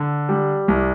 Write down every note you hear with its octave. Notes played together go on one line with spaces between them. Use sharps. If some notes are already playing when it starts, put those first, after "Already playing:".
Already playing: D3
G3
C2